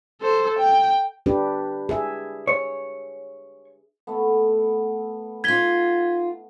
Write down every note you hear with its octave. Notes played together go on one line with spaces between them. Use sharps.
A4 C5
G5
D4 G4 B4
G#4 E5
C#5
A3 B3
D#4 F4 G#6 B6 G7